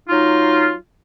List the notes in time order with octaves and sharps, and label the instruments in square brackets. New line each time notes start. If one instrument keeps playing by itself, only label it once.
[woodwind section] F#3 D#4 F4